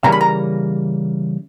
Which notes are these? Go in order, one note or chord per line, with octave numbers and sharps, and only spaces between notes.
C#3 E3 G3 A#3 C#4 A#5
B5
A#5